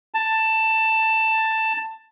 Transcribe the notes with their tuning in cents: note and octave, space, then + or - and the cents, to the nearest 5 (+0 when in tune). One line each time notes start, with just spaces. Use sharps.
A5 +10